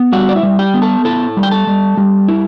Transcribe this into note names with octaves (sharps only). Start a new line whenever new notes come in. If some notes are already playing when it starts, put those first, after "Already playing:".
Already playing: B3
G3 F#4 F#5
D5
E4 E5
G3
G4 G5
B3
A4 A5
E4 A4 A5
G3
G5
A4 A5
G3
G3
E4